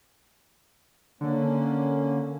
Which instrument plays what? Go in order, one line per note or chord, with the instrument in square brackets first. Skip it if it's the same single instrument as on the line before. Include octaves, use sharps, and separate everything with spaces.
[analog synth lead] D3 [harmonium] A#3 C#4